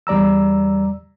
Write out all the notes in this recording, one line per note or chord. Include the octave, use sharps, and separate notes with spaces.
E2 G3 D5 A#5 E6